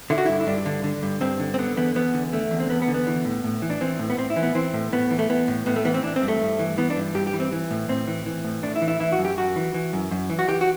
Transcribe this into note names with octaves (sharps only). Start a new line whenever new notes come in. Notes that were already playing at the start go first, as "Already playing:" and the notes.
D3 E4
F#4
G2 E4
E4
G2 D4
D3
D3
G2
G2 C4
D3
C4
D3 B3
E2 B3
E2 B3
D3
D3 A3
E2
C4
E2 B3
B3
D3
B3
E3
A2
A2
E3
D4
E3 C4
A2
B3
A2 C4
E4
E3
B3
E3 C4
A2
A2 B3
E3
A3
E3 B3
A2
A2 B3
A3
E3 B3
C4
E3 D4
C4
G2
A3
G2
E3
E3 B3
D4
G2
G2 G4
G4
E3
C4
E3
A2
A2 C4
E3
E3
A2
A2 D4
E4
E3
E4
E3 E4
F#4
F#2
G4
F#2 F#4
E3
E3
F#2
F#2
E3
F#4
E3 G4
F#4